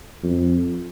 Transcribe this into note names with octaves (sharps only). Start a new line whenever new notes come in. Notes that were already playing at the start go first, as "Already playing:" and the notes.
F2